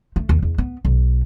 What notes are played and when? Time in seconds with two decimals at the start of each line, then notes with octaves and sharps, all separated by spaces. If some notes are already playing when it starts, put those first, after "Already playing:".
0.16 A3
0.29 D#2
0.42 E2
0.58 B3
0.85 B1